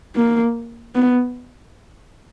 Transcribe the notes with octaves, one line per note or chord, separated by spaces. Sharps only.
A#3
B3